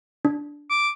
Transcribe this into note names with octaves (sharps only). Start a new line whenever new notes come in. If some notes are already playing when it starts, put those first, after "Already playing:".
D4
D6